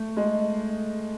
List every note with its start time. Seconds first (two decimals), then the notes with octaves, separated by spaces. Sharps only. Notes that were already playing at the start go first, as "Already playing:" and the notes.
Already playing: A3
0.17 G#3